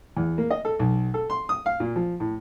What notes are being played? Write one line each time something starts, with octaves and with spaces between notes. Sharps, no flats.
E2
A#3
D#5
A4
B1
A4
C6
D#6
F5
A#2
F3
A2